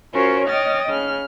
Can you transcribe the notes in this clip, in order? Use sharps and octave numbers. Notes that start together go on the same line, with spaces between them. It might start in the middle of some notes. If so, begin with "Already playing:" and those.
C#4 F4 F#4 A#4 C5 C#5
C#5 D#5 G5 D#6 F6 A6
C#3 F6